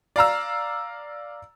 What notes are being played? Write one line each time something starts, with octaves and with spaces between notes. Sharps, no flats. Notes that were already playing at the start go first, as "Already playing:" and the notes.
D5 F5 A#5 E6